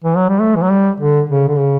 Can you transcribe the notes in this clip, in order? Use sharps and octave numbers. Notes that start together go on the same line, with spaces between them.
E3
F#3
G3
A3
E3
F#3
G3
D3
C#3
D3
C#3